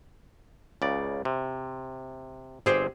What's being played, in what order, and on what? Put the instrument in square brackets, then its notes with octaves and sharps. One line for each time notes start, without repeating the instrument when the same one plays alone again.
[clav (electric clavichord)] C#2 C#3 D5
C3
[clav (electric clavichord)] G1 G#4 C5 [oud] C4 G4